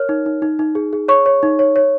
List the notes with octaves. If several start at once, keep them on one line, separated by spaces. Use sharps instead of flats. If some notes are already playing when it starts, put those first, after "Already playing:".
Already playing: A#4 C#5 F6
D#4
D#4
D#4
D#4
G#4
G#4
C#5 C#6
C#5
D#4
C#5
C#5